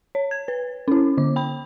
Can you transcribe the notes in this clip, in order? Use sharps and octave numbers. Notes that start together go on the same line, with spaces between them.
C#5
G#6
B4
C#4 E4
D3 D6
G5 B5